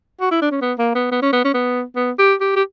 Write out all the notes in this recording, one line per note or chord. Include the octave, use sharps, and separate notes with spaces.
F#4
E4
D4
C#4
B3
A#3
B3
B3
C#4
B3
C#4
B3
B3
G4
G4
G4